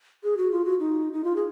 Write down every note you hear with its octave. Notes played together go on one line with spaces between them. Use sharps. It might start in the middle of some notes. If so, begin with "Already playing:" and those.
G#4
F#4
F4
F#4
D#4
D#4
F4
G#4